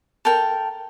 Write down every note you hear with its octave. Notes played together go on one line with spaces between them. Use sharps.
A4 A#4 G5